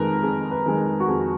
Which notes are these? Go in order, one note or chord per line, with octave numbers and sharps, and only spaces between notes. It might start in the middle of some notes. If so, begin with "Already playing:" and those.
Already playing: F2 D#3 G#3 A#4 B4
F2 G#4
B4
D#3 G#3
F#4
F2 G#4